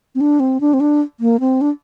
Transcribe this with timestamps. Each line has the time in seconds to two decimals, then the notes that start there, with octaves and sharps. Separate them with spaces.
0.15 C4
0.21 D4
0.40 C4
0.61 D4
0.74 C4
0.80 D4
1.20 A#3
1.40 C4
1.61 D4